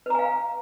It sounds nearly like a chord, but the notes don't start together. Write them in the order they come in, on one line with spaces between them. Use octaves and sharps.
B4 A#5 G#5 F5